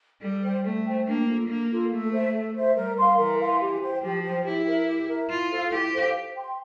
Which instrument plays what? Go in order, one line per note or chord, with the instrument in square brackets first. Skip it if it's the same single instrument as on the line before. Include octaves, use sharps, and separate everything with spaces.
[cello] G3 [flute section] A4
[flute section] C5 G5
[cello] A3 [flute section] A4
[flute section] C5 G5
[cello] A#3 [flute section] D4
[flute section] F4 A4
[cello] A#3 [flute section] D4
[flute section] F4 A4
[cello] A3 [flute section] A4
[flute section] C5 E5
A4
C5 E5
[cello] G3 [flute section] A#4
[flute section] F5 C6
[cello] E3 [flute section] A#4
[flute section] F5 C6
G4
C5 G5
[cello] F3 [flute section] G4
[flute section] C5 G5
[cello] E4 [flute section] G4
[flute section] A#4 E5
G4
A#4 E5
[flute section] E4 [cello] F4
[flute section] A4 C5 F5
[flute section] E4 [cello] G4
[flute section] A4 C5 F5
C5
G5 C6